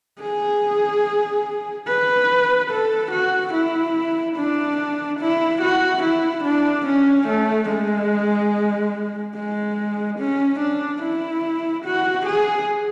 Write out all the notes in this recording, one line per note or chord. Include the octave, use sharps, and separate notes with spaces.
G#4
B4
A4
F#4
E4
D4
E4
F#4
E4
D4
C#4
A3
G#3
G#3
C#4
D4
E4
F#4
G#4